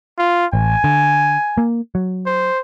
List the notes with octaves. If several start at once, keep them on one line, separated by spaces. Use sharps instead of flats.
F4
A1 G#5
D3
A#3
F#3
C5